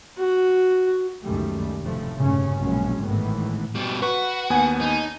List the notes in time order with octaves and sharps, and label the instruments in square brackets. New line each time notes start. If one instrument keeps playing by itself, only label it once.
[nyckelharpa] F#4
[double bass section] C#2 F#2 D#3 G3 A3
F1 A2 F3 A3
F1 G2 A#2 C#3 C#4
A#1 F#2 B2 G#3 C#4
G#1 A2 D#3 E3 B3
[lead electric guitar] B2 G3
[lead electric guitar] F#4 [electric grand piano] B4 C#6
[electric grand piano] D#2 B3 G#5
[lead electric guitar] D#4